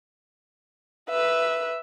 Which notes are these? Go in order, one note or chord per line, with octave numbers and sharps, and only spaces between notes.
B4 E5